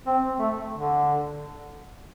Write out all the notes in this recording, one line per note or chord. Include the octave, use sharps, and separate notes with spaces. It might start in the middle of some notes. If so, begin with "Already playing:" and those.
C4
A3
D3